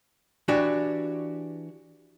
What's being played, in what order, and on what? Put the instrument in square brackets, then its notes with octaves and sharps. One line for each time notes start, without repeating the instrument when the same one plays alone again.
[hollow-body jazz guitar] E3 D4 F#4 G4